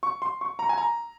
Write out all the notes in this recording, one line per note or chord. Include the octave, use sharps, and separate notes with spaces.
C#6
C6
C#6
A#5
G#5
A#5